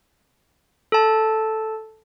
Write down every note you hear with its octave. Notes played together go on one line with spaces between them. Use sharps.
A4 A5